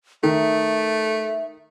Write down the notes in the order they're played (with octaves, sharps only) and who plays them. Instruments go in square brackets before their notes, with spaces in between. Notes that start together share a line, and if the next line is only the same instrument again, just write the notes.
[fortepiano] D#3 [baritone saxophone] A3 [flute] E5